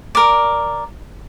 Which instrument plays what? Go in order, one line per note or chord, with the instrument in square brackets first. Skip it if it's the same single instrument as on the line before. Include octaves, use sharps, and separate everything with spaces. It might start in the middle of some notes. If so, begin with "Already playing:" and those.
[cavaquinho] A#4 D5